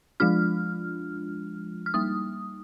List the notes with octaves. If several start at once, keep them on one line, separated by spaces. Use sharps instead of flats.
F3 G#3 D4 F4 F6
F6
G3 A#3 D#4 D#6